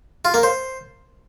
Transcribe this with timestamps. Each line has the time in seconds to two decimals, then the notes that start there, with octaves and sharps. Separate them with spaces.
0.25 F4
0.34 A#3
0.43 C5